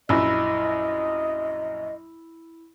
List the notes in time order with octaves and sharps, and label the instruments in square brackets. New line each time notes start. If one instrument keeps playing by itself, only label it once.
[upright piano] A#1 F#2 [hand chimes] E4 B5 E6 [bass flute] D#5